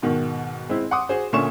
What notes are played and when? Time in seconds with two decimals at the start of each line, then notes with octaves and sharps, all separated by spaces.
0.02 G#2 B2 D#3
0.69 G#3 C4 E4
0.91 F#5 C6 D6 D#6
1.09 F#4 G#4 C5
1.33 A#2 D3 C#4 E5 C#6 E7